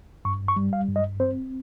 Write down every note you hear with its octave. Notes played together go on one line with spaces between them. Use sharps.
G2 C#6
C#6
G3
F5
G2
D#5
C4 C5